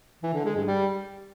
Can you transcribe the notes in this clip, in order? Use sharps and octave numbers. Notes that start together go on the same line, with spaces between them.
E3
D3
G#3
G2
G3